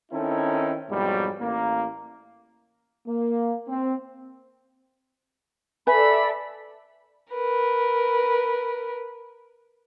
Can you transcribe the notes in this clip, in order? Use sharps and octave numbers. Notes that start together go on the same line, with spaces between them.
D#3 C4 C#4 D#4 E4 A4
F2 G#2 B2 F#3 G3
A1 A#3
A#3
C4
A4 B4 D5 E5 G#5 B5
A#4 B4